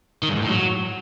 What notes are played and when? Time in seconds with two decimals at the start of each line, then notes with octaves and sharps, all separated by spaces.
0.23 D#3
0.29 G2
0.36 G#2
0.42 A2
0.49 F#3